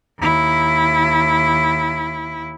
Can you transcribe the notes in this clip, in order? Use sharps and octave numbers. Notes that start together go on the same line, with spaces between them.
D#2 E4